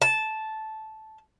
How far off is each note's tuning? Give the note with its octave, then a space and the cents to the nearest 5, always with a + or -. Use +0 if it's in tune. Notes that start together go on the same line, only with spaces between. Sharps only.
A5 -10